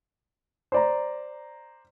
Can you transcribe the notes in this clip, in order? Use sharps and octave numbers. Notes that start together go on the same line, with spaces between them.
C5 D5 A#5